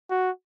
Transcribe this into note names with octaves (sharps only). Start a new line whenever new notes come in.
F#4